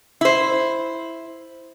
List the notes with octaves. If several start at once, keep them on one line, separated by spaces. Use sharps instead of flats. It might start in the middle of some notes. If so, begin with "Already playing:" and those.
E4 C5